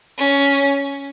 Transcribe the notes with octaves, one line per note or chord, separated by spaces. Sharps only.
C#4